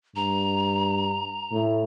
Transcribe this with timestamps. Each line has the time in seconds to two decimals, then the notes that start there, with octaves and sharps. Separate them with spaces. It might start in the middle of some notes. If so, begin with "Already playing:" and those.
0.16 G2 A#5
1.52 A2